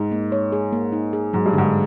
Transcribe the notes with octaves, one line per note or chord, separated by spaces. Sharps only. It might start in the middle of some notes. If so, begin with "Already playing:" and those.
Already playing: G#2 D#4
A#3
C#5
G#4
A#3
D#4
G#4
G#2 F#3
G2
G#2 D3